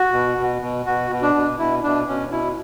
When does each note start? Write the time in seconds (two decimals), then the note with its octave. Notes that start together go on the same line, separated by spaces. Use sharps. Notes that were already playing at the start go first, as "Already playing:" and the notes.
Already playing: F#4
0.13 B2
0.37 B2
0.62 B2
0.86 B2 F#4
1.11 B2
1.22 D4
1.34 B2
1.58 B2 E4
1.83 B2 D4
2.08 B2 C#4
2.31 B2 E4